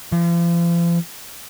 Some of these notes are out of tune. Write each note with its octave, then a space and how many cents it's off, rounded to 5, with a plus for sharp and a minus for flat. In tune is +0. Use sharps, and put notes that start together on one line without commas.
F3 -40